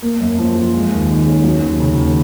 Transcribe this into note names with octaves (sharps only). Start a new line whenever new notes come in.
A#3
F#2
F3
F4
G#3
D#2
D#3
C#4
F#3
D#2
C#3
D#2